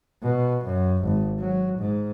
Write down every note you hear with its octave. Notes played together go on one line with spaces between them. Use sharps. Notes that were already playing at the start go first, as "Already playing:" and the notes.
B2
F#2
G#1
F#3
G#2